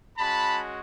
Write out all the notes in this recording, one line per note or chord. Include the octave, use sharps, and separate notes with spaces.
G#3 C#4 F#4 A5 B5